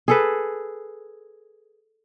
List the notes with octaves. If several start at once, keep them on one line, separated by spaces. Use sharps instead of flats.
G#4 A4 B4